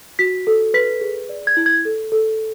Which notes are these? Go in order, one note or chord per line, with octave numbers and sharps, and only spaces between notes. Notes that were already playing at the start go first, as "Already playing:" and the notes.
F#4 B6
A4
B4 B6
G#4
D5
G#6
E4
G#6
A4
A4